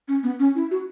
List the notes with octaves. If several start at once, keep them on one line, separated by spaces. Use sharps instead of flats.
C#4
B3
C#4
E4
F#4